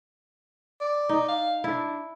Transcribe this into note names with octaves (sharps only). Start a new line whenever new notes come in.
D5
D#4
F5
D4 E4